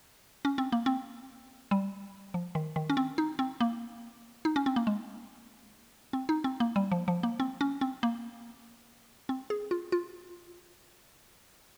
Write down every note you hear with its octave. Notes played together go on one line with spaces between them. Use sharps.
C#4
C4
A#3
C4
G3
F3
D#3
D#3
C#4
C4
D#4
C4
A#3
D#4
C#4
C4
A#3
G#3
C4
D#4
C4
A#3
G3
F3
F3
A#3
C4
C#4
C4
A#3
C4
G#4
F4
F4